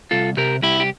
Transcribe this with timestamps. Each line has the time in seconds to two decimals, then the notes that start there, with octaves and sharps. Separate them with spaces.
0.11 C2 F4 A4
0.37 C3 G4 A#4
0.62 C2 E4 G4
0.80 G4